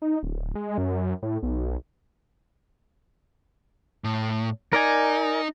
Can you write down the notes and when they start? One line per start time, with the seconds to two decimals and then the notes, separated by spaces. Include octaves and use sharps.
0.02 D#4
0.23 D1
0.55 G#3
0.78 F#2
1.23 A2
1.43 B1
4.04 A2
4.73 D#4 A#4 D5 G#5